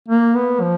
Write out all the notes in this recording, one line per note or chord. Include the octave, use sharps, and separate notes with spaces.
A#3
B3
F3